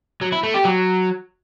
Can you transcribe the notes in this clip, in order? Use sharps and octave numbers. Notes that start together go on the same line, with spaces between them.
F#3
E4
A3
G4
F#3